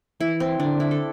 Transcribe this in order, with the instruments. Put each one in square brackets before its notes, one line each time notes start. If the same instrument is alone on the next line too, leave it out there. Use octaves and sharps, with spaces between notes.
[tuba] E3 [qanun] E4
[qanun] C4
[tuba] D3 [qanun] D4
[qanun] E4
A4